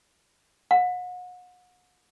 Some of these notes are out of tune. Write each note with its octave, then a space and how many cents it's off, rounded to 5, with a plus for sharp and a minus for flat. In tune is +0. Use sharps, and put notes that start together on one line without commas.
F#5 -35